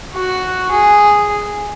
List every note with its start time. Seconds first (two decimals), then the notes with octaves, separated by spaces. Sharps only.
0.14 F#4
0.72 G#4